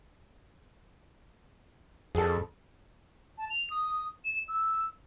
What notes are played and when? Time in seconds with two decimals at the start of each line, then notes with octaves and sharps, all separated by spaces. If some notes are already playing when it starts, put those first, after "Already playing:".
2.15 F2 G#4 A4
3.38 A5
3.50 F7
3.70 D#6
4.25 E7
4.48 E6